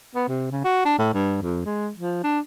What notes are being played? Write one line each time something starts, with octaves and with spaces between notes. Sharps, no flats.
B3
C3
C#3
F#4
D4
A2
G2
F2
G#3
F3
D4